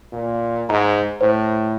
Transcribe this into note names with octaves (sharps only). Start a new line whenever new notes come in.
A#2
G#2 A#5
A2 C5